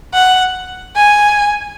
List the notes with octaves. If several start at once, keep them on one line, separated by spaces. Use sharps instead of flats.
F#5
G#5